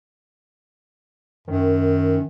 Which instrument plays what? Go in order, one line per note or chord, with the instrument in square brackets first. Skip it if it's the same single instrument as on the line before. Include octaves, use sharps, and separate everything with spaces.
[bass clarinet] F#2 [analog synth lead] D#3